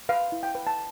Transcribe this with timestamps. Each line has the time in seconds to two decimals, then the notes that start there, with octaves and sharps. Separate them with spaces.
0.09 B4 F5
0.32 E4
0.43 G5
0.55 B4
0.67 A5